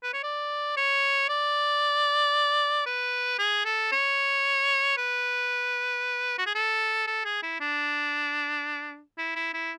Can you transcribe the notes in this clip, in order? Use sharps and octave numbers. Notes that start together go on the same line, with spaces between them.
B4
C#5
D5
C#5
D5
B4
G#4
A4
C#5
B4
F#4
G#4
A4
A4
G#4
E4
D4
E4
E4
E4